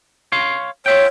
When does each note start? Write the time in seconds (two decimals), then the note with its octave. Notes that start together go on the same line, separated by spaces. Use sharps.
0.32 C#5 F5 C6
0.86 F4 C#5 E5 G5